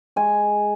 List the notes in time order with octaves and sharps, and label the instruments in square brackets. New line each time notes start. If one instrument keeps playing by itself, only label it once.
[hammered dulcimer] G#3 G#5